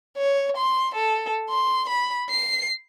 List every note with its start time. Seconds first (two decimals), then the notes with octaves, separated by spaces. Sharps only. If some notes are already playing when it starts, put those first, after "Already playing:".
0.17 C#5
0.57 C6
0.95 A4
1.50 C6
1.89 B5
2.30 C7